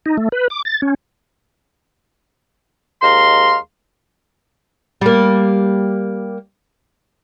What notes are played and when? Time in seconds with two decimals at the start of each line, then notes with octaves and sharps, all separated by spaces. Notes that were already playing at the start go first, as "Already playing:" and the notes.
0.06 D#4
0.18 A3
0.32 B4
0.50 D6
0.65 A6
0.82 C#4
3.02 D#2 G#3 F5 A#5 C6
5.01 G3 A#3